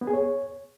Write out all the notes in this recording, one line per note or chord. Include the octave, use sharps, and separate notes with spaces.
B3
G#4
C#5